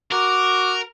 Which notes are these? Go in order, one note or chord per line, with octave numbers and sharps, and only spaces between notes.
F#4 A#4 D6